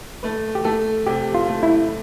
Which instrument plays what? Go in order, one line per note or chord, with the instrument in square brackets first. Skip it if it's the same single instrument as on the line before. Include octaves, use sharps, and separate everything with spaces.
[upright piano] A3 [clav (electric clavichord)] B4
[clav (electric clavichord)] G4
[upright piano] A3 [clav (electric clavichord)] A4
[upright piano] C3 [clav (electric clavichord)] G4
[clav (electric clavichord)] F4
[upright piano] A3
[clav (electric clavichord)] E4